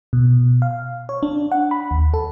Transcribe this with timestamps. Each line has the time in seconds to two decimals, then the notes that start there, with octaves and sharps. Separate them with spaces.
0.13 B2
0.62 F5
1.09 C#5
1.23 D4
1.52 F#5
1.71 B5
1.91 D#2
2.14 A4